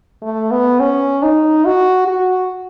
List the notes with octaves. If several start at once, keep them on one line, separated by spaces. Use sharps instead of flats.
A3
B3
C#4
D#4
F#4
F#4